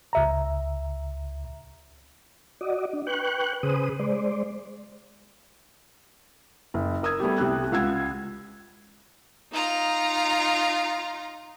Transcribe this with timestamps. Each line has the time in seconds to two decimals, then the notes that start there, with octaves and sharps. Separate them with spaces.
0.13 C#2 E5 A#5
2.61 F#4 D5 D#5
2.93 D4
3.07 B4 G5 C#6 F#6
3.63 C#3 G#4 B4 C5 D#6
3.99 G#3 C5 D5
6.74 F#1
7.03 A#4 D#6 E6 G#6
7.20 G3 A3 B3 G4
7.38 C2 C3 G4 E6 F#6
7.72 C#2 F4 F#5 E6 G#6
9.52 D#4 F4 A#5